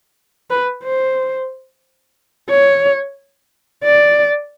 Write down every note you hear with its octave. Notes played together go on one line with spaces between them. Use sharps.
B4
C5
C#5
D5